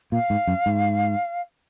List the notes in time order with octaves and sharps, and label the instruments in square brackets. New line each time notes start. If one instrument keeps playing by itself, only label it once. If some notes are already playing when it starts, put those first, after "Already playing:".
[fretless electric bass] A#2 [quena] F5
[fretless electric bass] G#2
F#2
G#2